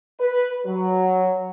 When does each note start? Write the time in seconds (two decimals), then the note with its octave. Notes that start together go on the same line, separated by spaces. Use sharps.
0.20 B4
0.66 F#3